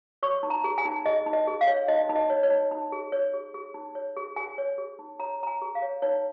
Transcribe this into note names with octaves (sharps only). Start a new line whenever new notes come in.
C#5 C#6
D#4
A#5
G#4
G#5
D#4
G#4 D#5
D#4
D#5
G#4
F5
C#5
D#4 D#5
D#4
D#5
C#5
C#5
D#4
D#4
G#4
C#5
G#4
G#4
D#4
C#5
G#4
G#4 G#5
C#5
G#4
D#4
C#5 A#5
C#5 A#5
G#5
G#4
F5
C#5
D#4 C#5